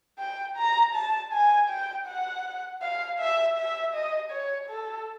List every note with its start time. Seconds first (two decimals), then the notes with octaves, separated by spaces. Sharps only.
0.19 G5
0.57 A#5
0.94 A5
1.33 G#5
1.69 G5
2.07 F#5
2.82 F5
3.19 E5
3.57 E5
3.94 D#5
4.31 C#5
4.69 A4